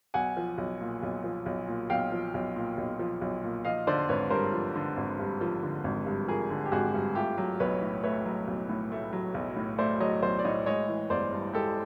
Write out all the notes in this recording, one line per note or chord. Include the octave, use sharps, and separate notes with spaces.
B1 F#5 G#5
F3
B1
A#2
B1
F3
B1
A#2
B1 F5 G5
F3
B1
A#2
B1
F3
B1
A#2
F3 D#5 F5
D3 C5 D5
G#1 B4 C#5
G2 A#4 C5
F3
D3
G#1
G2
F3
D3
G#1
G2
F3 G#4 A#4
D3
G4
G#1 F#4 G#4
G2
A3 F4 G4
F#3
B1 B4 C#5
A2
A3 B4 C#5
F#3
B1
A2
A3
F#3
B1
A2
A3 C5 D5
F#3 C#5 D#5
B1 C5 D5
D5
A2 C#5 D#5
G#3 C#5 D#5
E3
G1 C5 D5
G2
G#3 G4 A4